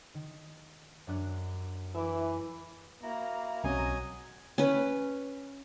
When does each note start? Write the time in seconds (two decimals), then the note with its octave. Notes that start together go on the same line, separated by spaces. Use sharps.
0.14 D#3
1.07 F#2 D4 F#6
1.95 E3 E5 D6
3.03 A#3 E4 F#4 A#5
3.64 B1 F#3 C4 C#4 D#5 G#5
4.58 C#4 B4